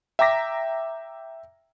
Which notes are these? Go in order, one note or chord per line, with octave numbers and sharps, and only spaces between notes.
E5 G5 A#5 D6 A#6 B6